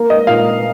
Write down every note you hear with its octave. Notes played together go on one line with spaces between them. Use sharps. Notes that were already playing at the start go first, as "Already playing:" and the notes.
Already playing: A#3
D#5
A#2 F5